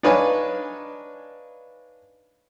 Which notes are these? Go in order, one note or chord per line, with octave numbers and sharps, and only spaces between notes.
D4 D#4 B4 C#5 F5 G#5